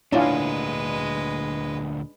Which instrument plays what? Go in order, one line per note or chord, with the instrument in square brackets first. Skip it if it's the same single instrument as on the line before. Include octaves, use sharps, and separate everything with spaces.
[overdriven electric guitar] D2 A#2 [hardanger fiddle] G#3 B4 [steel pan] C#4 E4 F4 [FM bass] D4